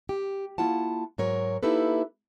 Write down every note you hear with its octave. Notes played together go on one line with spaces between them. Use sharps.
G4
A#3 E4 F4 F#5 A5
G#2 F#3 A#4 C#5
A#3 D#4 E4 G4 A4 B4